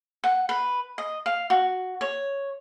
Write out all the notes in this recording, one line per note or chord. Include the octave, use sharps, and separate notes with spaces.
F#5
B4
D#5
F5
F#4
C#5